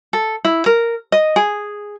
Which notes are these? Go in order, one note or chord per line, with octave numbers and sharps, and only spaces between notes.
A4
E4
A#4
D#5
G#4